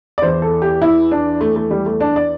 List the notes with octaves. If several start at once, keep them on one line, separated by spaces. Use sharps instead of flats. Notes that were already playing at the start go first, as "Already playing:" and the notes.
D5
E2 E3 C5
A4
G4
E4
D4
A3
A3
G3
A3
D4
D5